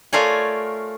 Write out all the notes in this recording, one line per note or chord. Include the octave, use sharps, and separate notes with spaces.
A3 F4 A#4 C#5 D5 G#5